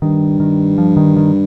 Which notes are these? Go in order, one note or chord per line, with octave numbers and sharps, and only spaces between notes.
G2 D#3
D#3
F3
D#3
D#3